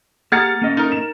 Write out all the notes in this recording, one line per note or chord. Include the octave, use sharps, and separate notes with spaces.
A#3 G4 G#4 F#5 A#5 F6 A6 C#7
A#3 C#4 D#5
D#4 A#4
E7